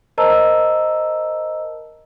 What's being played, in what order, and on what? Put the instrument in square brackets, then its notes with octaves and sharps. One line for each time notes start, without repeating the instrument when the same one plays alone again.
[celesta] A#4 C5 D#5 A5 A#5 E6